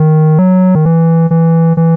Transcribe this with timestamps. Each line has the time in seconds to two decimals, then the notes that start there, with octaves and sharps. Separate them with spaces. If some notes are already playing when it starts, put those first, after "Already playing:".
Already playing: D#3
0.39 F#3
0.75 D#3
0.85 E3
1.31 E3
1.77 E3